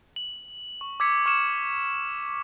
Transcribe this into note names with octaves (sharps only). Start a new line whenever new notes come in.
F#7
C#6
D6 E6 G#6 B6 C#7
C#6 F6 C#7 E7